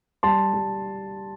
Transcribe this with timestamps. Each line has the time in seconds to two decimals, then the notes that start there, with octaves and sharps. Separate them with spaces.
0.23 G3 A5 C6
0.53 G3